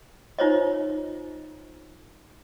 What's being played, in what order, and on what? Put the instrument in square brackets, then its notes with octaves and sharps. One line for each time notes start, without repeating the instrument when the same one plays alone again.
[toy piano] D#4 F4 C5 C#5 D#5